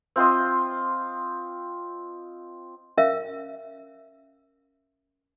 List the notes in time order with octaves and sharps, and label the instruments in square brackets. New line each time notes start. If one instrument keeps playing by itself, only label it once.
[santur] C4 F4 C5 D#5
[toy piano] C#4 A#4 E5 F5